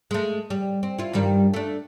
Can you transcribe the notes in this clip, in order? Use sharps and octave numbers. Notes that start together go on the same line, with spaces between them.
G#3 A3
G3
C4
E4 F4
G2 D#3 G3
A3 D4